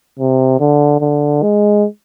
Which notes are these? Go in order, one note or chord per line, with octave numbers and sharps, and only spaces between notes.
C3
D3
D3
G#3